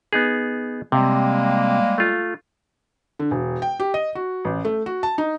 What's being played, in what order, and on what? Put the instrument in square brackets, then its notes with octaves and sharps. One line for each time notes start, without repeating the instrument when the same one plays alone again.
[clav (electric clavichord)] B3 D#4 G#4
[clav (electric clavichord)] C3 [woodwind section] G3 G#3 A#3
[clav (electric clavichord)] A3 F4
[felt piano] D3
E1
G5
G4
D#5
F#4
A1
A3
F#4
A5
D#4